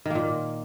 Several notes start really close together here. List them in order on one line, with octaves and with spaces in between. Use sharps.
D#3 A#3 A#2